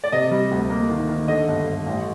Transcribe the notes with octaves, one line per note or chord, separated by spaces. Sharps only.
D5
C3 D#5
G3
D2
A#3
D#3
D#3
D3 D#5
G1
G1
A1